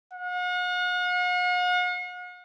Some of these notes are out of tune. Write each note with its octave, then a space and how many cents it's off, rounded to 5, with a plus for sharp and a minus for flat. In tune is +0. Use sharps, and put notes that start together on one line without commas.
F#5 -45